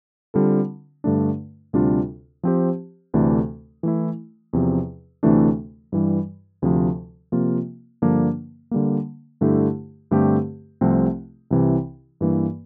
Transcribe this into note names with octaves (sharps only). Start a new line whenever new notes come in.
D3 G3 C4 F4 A4
G2 D3 A3 D4
D2 C3 G3 D4 F4
F3 C4 G4 C5
D2 C3 E3 A3 D4
E3 A3 E4
E2 C3 F3
D2 C3 E3 A3 D4
G2 E3 G3
D2 C3 F3
C3 F3 A#3 F4
G2 D3 F3 A#3 D4
D3 G3 A#3
G2 D3 A3 E4 G4
G2 D3 A3 C4 G4
C2 C3 F3 A3 C4
C2 C3 E3
G2 E3 A#3